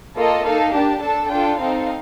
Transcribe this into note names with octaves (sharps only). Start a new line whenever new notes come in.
A#3 F4 A4 D#5
A#3 D#4 A4 F5
D4 G4 A5
D4 A4 A5
D4 F4 A4 G5
C4 D#4 A4 F5